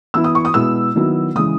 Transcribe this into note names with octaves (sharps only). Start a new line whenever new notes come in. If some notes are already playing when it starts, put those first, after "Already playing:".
E3 B3 E4 E6
D#6
C#6
D#6
B2 G#3 B3 E4 E6
D#3 F#3 B3 E4
C#3 E3 G#3 D#6